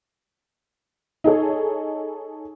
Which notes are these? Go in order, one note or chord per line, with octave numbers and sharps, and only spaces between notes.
D#4 G#4 A4 C#5